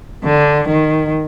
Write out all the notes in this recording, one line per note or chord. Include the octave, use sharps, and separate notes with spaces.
D3
D#3